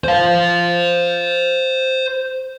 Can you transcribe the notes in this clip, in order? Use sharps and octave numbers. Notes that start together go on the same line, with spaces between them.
C5 F5